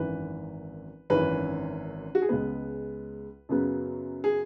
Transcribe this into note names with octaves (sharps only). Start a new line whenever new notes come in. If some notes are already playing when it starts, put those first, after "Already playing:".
Already playing: G#1 F#2 E3 B4
G#1 F#2 E3 C#4 B4
F#4
G#4
C#2 C#3 G#3 B3 B4
F#2 C#3 F#3 B3
G#4